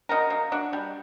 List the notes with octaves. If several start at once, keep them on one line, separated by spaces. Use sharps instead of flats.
D#4 F#4 A#4
A#3
D4 F#4
G3